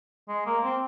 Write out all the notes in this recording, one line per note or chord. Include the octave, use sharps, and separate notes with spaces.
G#3
A#3
C4